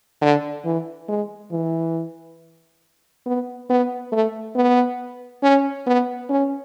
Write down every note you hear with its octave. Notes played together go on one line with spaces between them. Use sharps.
D3
E3
G#3
E3
B3
B3
A3
B3
C#4
B3
C#4